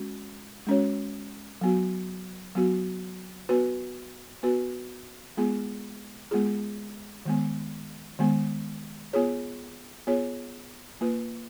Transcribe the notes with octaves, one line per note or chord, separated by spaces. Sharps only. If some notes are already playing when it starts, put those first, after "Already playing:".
Already playing: G#3 C#4 F#4
G#3 C#4 F#4 C#5
F#3 B3 F#4
F#3 B3 F#4
B3 F#4 B4
B3 F#4 B4
G#3 B3 F4 G#4
G#3 B3 F4 G#4
D#3 G#3 B3
D#3 G#3 B3
B3 F4 G#4 C#5
B3 F4 G#4 C#5
A#3 F4 B4